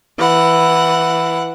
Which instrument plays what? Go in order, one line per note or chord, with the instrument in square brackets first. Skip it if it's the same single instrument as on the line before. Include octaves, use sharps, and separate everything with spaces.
[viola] E3 F#5